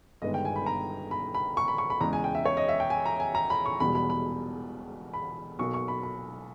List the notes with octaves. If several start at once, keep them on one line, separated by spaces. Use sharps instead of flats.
G1 G2 D#3 G#3 B3 D#5
G5
G#5
B5
A#5
B5
B5
C#6
B5
C#6
B5
E2 C#3 G#3 A#5
G#5
G5
E5
C#5
D#5
E5
G5
G#5
A#5
G#5
A#5
B5
C#6
E1 E2 B2 G3 B5
B5
B5
B5
B1 B2 A#3 C#6
C#6
B5
B5